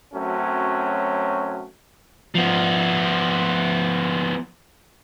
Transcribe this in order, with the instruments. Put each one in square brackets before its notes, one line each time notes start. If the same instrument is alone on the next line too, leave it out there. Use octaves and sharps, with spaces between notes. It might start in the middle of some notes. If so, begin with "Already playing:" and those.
[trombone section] F#2 F#3 A3 C4 C#4
[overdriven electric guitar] F3 B3